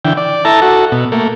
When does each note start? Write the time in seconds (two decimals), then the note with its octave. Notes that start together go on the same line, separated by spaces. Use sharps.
0.05 D3 E3 G5
0.17 D5
0.45 E4 A4 A5 A#5
0.62 F#4 A4
0.92 B2
1.12 A3 A#3